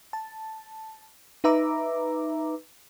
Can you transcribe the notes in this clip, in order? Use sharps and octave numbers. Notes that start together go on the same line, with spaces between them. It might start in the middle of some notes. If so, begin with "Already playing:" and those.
A5
D#4 B4 E5 A#5 D6